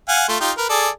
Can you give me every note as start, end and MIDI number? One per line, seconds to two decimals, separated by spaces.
0.08 0.25 77
0.08 0.25 78
0.08 0.25 80
0.29 0.39 57
0.29 0.39 65
0.40 0.52 63
0.40 0.52 65
0.40 0.52 67
0.58 0.68 70
0.58 0.68 71
0.69 0.89 68
0.69 0.89 69
0.69 0.89 74